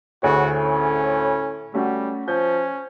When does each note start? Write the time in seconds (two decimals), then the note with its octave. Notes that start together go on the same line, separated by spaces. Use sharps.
0.23 D2 A2 F#4 G#4 C#5
0.62 C#4
1.74 G3 A3 C#4 F#4
2.28 F3 C#4 G6